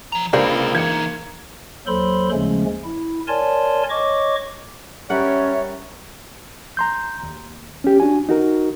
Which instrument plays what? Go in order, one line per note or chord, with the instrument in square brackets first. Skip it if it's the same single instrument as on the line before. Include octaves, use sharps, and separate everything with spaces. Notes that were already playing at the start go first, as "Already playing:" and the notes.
[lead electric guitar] F3 A#5
[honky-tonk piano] C#2 [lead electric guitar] C3 B5 [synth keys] A#3 [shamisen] D4 C5 D5
[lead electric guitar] E3 D#4 [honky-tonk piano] G#6 C#7
[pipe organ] D#2 F#3 A4 C5 B5 C6
D#2 C#3 F3 G#3 A3 C#4
E4
A#4 C#5 D5 G#5 A5 C6
C#5 D#5 C#6 D6
[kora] G3 A#4 F#5 [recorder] C#4 [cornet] C#5 [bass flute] E5
[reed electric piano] A#5 C6 G6
D#2
C#4 G4
D4 F#4 G#5
D#4 F#4 A#4